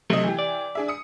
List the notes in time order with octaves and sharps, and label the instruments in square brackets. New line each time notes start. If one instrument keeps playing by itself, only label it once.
[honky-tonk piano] C3 D#5 [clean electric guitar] F#3 A3 C4
[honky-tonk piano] E3 G4
[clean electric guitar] D5
[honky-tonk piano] D4 G#4 E5
D#6 C#7